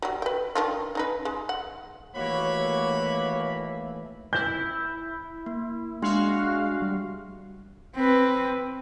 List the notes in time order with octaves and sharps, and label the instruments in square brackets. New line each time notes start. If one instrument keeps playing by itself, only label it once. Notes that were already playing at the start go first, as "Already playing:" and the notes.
[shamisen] F#3 G3
B4 G5
D#3 D4 F4
C#4 D#4 B4
G#3
F#5
[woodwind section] D#2 A#3 [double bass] E3 A3 [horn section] F#4 B5 [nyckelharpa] C#5
[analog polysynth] E4 [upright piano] G6
[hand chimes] A#3
[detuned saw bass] G#3 [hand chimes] D4 E5 C6 [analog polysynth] F#4 F5
[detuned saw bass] G3
[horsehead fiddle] C4 B4